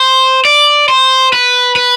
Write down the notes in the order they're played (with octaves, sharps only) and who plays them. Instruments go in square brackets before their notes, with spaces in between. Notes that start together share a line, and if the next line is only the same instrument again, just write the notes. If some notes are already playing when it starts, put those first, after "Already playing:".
Already playing: [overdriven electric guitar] C5
D5
C5
B4
B4